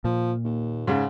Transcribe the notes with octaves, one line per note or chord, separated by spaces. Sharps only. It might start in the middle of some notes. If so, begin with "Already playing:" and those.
A#2 F3
D#2
G#2 C#3